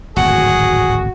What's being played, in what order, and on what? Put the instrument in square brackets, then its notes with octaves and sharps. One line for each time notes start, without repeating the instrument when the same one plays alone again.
[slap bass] D1 G#1 F2 [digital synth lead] F#4 [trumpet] G#4 [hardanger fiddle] F#5